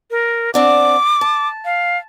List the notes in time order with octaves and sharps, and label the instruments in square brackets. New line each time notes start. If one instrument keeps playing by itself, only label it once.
[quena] A#4
[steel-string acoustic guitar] C4 D4 F#5 [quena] D6
[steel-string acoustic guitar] A5
[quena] F5